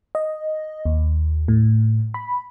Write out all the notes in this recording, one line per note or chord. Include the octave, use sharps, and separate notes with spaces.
D#5
D#2
A2
B5